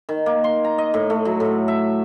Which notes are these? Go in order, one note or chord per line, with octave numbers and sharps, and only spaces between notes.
D#3
A#3
C6
A#5
D#5
A2
A3
F#3
A2
E5